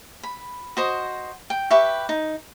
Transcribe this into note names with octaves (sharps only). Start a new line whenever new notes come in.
B5
F#4 C5 D#5
G5
G4 B4 E5 C#6
D#4